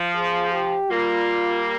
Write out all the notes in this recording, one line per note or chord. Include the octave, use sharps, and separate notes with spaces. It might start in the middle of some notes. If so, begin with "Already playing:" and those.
Already playing: F3
G#4
G4
G3 A#3 F4